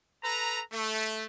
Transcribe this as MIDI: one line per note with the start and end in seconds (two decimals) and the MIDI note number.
0.23 0.61 69
0.23 0.61 71
0.23 0.61 82
0.71 1.25 57